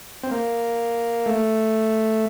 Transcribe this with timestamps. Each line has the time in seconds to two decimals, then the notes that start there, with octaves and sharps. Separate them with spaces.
0.23 C4
0.31 A#3
1.26 A3